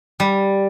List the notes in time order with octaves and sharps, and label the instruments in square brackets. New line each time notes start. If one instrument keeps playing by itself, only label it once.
[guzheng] G3